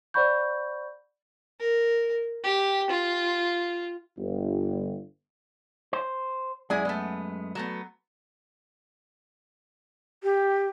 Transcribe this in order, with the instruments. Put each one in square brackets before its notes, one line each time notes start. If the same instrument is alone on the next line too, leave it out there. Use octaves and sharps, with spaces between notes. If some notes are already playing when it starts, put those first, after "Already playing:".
[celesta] C5 D5 F#5 B5 C#6 G6
[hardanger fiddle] A#4
G4
F4
[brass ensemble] G1
[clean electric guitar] C5
[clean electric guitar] F#2 G#3 [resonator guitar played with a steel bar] E4 G#4 D5
[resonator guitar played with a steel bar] A3 B3
F#3 A3 B3
[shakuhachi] G4